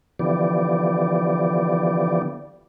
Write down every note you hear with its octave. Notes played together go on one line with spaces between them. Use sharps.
D3 E3 F3 B3 G4 D5